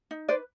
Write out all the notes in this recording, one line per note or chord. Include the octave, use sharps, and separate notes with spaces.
D#4
B4 C5 D5